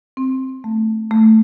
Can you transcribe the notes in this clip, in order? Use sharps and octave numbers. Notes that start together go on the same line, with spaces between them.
C4
A3
A3